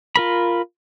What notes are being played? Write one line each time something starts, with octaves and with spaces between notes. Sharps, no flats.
F4 A#4 B5